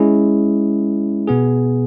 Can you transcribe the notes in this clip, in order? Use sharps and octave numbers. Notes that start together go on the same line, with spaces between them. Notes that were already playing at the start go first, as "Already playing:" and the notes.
Already playing: G#3 C#4 E4 G#4
B2 B3 G#4